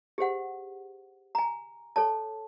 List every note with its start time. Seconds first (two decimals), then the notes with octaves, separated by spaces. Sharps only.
0.18 G4 G#4 C5 F#5
1.35 G#5 A#5
1.96 A4 C#5 A5